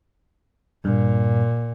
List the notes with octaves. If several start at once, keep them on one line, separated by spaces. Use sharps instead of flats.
G2 A#2